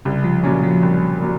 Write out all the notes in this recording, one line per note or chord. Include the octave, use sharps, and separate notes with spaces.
C2 C#3
F3
A#2 C#3 F#3 C#4
F3
C2
A#2 F#3